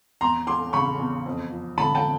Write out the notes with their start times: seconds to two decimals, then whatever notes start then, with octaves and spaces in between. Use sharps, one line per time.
0.21 E2 A#5 C6
0.47 E3 C6 D6
0.73 C#3 B5 C#6
0.99 E2
1.26 F2
1.51 F3
1.78 D3 A5 B5
1.95 G5 A5